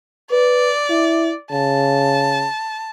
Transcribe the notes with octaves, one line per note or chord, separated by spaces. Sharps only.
B4 D5
E4
C#3 A5